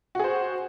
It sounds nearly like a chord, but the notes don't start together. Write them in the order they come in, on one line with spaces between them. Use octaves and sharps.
F#4 G#4 C5